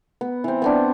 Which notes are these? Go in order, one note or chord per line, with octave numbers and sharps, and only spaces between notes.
B3
E3 C4
B3 C4 D4